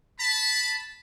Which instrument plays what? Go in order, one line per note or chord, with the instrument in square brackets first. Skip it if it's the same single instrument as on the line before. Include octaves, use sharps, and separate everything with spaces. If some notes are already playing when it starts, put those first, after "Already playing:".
[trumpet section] A5 B5